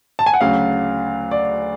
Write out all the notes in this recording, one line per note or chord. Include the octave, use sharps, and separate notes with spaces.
A5
G#5
F#5
D2 C#3 F#3 F5
D5